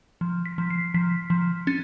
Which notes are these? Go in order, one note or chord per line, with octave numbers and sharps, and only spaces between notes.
F3
B6
F3
C7
F3 B6
F3
C#4 A6